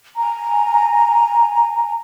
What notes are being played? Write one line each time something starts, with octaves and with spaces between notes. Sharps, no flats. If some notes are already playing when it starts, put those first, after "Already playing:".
G#5 A#5